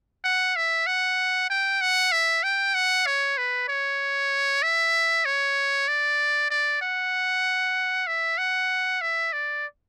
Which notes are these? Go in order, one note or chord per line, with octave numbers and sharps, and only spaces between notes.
F#5
E5
F#5
G5
F#5
E5
G5
F#5
C#5
B4
C#5
E5
C#5
D5
D5
F#5
E5
F#5
E5
D5